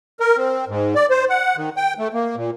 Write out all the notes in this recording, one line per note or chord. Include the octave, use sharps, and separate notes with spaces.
A#4
C4
G#2
D5
C5
F#5
D#3
G5
A3
A#3
A#2